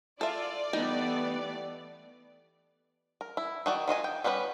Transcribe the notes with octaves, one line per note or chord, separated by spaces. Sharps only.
F4 A4 D5 E5
E3 G3 A3 B3 D#4
A#4
E4
D#3 F#4 D5
D#3 F4 D#5 G#5
G5
G3 B3 C#4 F4 B4